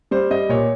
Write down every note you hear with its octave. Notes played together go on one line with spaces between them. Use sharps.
G3 C5
G3 D#5
A#2 C#5